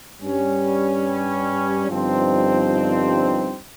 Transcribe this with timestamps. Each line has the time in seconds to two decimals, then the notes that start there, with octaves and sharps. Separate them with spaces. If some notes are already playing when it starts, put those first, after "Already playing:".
0.22 G2 G3 C#4
1.88 G1 G2 F3 C4 D#4